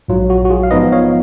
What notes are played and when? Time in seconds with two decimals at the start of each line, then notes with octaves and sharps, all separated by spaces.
0.08 A#1 G#2 F#3 F4
0.30 F#4
0.45 F#4
0.50 F4 G#4
0.63 F5
0.71 G#2 F3 B3 D#4 B4 D#5
0.92 C#5 F5